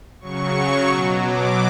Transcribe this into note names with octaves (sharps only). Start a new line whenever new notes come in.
C#3 F#3 C#6
B2 F#3
D6